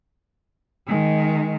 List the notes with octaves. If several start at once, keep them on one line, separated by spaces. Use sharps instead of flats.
D#3 G#3